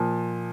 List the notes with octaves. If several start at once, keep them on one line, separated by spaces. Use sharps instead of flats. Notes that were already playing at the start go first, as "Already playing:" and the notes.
Already playing: A#2 F3